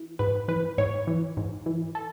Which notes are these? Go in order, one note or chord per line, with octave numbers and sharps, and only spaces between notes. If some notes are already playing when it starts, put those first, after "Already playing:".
Already playing: E3
G#2 B4
E3 B4
G#2 C#5
E3
G#2
E3
A4